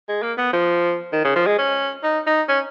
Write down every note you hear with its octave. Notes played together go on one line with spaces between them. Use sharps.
G#3
A#3
B3
F3
D#3
C#3
F3
G#3
C#4
D#4
D#4
C#4